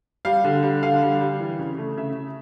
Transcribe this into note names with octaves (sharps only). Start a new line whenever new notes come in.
G3 F5
D3
G3
D3 F5
G3
G3
E3
C#3
A3
C#3 E5